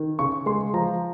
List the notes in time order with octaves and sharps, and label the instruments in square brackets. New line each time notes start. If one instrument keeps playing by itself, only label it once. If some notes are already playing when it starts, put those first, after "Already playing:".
Already playing: [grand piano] D#3
C#3 C#6
G#3 C6
F3 A#5